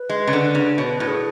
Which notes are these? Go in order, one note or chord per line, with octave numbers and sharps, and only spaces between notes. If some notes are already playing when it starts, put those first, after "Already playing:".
Already playing: B4
G#3
C#3
D3
C#3
B2 B4 C#5
A2
G#4